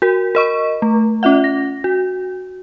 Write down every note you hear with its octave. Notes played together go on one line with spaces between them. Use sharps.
F#4 A#4
A#4 D#5 C#6
A3
C#4 F4 E5 F#5
A#6
F#4